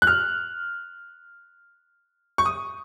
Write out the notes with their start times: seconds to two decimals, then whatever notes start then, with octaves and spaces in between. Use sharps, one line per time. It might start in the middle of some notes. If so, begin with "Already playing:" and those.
0.02 F#6
0.07 F6
2.38 C#6
2.46 D#6